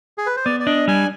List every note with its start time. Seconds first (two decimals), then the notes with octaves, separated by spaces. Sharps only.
0.18 G#4
0.26 B4
0.36 C5
0.45 B3 D5
0.60 D5
0.66 D4 D#5
0.88 G3 G#5